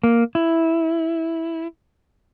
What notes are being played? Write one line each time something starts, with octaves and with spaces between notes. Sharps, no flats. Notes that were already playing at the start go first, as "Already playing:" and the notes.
A#3
E4